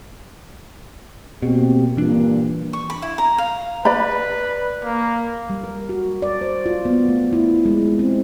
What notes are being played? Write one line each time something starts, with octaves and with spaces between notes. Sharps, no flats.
B2 A#3 C4 G4
G2 A#2 E3 D4
C#6
B5
E4
A#5
F5
B4 D5 B5
A#3
G3
A#4
F#4
D5
C5
F4
B3
A3
E4
G#3
C4